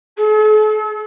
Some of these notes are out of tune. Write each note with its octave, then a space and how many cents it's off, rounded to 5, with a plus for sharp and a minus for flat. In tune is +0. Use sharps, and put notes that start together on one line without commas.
A4 -45